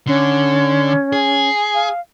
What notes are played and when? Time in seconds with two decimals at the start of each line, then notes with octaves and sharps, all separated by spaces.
0.07 D3 C#4
1.13 G#4
1.74 F5